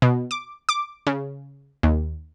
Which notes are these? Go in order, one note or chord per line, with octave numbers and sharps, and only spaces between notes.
B2
D6
D6
C#3
D#2